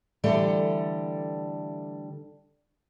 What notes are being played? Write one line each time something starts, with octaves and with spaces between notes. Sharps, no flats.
D3 E3 G3 A3 A4 D5